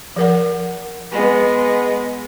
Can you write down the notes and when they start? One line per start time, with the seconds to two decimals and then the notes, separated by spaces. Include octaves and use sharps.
0.16 F3 A#4 F#5
1.12 G#3 B3